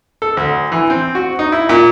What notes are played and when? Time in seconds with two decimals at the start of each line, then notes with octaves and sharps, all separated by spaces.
0.22 A4
0.37 D2
0.72 E3
0.90 C4
1.15 F#4
1.39 D#4
1.52 E4
1.69 A#2